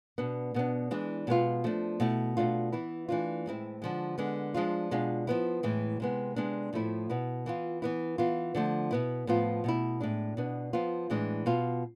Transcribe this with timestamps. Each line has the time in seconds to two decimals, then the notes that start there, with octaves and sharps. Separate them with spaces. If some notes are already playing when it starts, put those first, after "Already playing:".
0.18 B2 B3 D4
0.54 B2 B3 D4
0.91 E3 G#3 D4
1.27 B2 G#3 B3 F4
1.64 F3 A3 D4
2.00 B2 A3 E4
2.37 B2 A3 D4 F4
2.72 E3 B3 E4
3.09 E3 A3 D4 F4
3.46 A2 G#3 C4 E4
3.82 D3 F3 G#3
4.18 D3 G#3 B3
4.54 F3 G#3 D4 F4
4.91 B2 G#3 D4 F4
5.27 F3 B3 E4
5.63 A2 E3 G#3
6.00 C3 G#3 B3
6.36 C3 G#3 B3 D4
6.73 A2 F3 A3 E4
7.09 B2 B3 E4
7.46 E3 B3 F4
7.82 E3 B3 E4
8.18 E3 B3 F4
8.55 D3 F3 A3
8.91 B2 B3 E4
9.27 A2 F3 B3 F4
9.64 B2 A3 E4
10.01 A2 G#3 D4
10.37 B2 B3 D4
10.73 F3 B3 F4
11.10 A2 E3 G#3 D4
11.46 B2 B3 F4